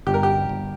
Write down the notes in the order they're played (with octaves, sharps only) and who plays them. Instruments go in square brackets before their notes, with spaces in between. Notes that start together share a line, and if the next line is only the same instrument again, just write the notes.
[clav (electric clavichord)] G1 [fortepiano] G4
[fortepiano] A#4
G4
[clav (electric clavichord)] G1